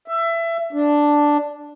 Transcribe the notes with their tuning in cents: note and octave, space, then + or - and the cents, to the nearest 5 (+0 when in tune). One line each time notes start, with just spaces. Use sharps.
E5 +20
D4 +0